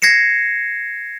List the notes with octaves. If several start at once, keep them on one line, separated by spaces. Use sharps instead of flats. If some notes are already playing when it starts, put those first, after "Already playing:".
G#6 A#6 C7 C#7 E7